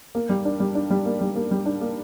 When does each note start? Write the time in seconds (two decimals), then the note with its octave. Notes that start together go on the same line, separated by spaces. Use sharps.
0.15 A#3
0.29 G3
0.45 D4
0.60 G3
0.75 D4
0.90 G3
1.06 A#3
1.21 G3
1.36 A#3
1.51 G3
1.66 D4
1.81 A#3